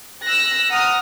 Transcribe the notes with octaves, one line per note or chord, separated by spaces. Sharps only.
E6 F#6 A#6
F#5 A#5 D#6 F6